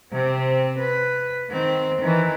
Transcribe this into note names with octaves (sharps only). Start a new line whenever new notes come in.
C3 C4
B4
D#3 C4
D#3 E3